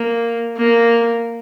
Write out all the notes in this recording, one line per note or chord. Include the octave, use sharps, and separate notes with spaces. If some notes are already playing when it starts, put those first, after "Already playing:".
Already playing: A#3
A#3